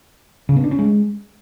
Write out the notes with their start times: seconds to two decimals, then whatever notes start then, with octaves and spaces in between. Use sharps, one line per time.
0.49 C#3
0.56 B3
0.64 D4
0.71 C#4
0.79 G#3